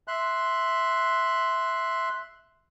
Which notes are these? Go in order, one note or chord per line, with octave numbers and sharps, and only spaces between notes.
E5 C6 F#6